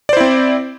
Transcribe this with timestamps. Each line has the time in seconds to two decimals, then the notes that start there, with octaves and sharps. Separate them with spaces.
0.09 D5
0.13 C5
0.17 E4
0.21 C4